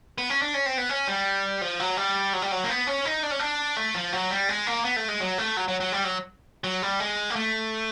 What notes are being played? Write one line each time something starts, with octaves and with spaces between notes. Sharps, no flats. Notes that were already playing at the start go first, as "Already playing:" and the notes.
B3
C#4
D4
C#4
C4
B3
C#4
G3
F3
F#3
G3
F#3
G3
F#3
A#3
B3
C#4
D#4
D4
C#4
D4
A3
F3
F#3
G3
G#3
A#3
B3
A3
G#3
F#3
A3
F#3
F#3
F#3
G3
F#3
F#3
G3
G#3
A#3
A3